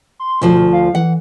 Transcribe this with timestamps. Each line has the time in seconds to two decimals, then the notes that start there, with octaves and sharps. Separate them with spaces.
0.19 C6
0.42 D2 B2 F3 C5
0.73 F5
0.95 E3 F#5